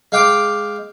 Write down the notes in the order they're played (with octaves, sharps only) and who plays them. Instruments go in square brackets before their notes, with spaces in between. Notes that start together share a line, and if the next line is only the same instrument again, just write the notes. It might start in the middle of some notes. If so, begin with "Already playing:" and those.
[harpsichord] G#3 F5 G5 D6